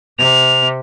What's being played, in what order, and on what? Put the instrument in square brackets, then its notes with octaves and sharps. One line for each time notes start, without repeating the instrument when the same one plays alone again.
[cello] C3 [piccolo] F7